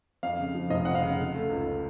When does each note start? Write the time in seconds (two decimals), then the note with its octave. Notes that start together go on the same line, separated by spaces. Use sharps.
0.23 F2 F5
0.39 C#3
0.55 F3
0.70 F1 D#5
0.85 F2 F#5
0.95 F5
1.03 C#3
1.18 C#3
1.35 A3
1.50 C#2